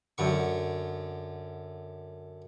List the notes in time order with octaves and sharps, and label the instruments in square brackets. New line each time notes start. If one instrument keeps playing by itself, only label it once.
[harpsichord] F#2 D3 C#6